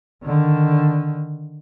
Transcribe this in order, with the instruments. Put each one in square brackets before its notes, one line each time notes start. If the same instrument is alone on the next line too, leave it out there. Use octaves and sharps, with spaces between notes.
[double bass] D3 D#3